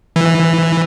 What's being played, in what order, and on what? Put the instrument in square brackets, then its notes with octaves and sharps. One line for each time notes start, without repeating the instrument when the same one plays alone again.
[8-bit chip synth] E3